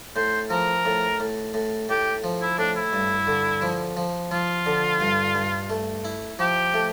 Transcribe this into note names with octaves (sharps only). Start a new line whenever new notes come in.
A2 C5
F3 A#4
A2
A2
A2
A2 G4
F3
E4
A2 D4
E4
G2
D3
F3
F3
F3 F4
D3
G2
G2
A3
E4
F3 G4
A3